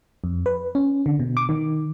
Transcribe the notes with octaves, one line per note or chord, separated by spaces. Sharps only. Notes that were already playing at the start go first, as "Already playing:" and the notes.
F2
B4
C#4
D3
B2
D6
D#3